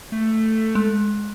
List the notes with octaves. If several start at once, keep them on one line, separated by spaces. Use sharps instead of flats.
A3
G#3